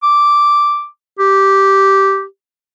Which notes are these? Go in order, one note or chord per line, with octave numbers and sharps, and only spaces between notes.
D6
G4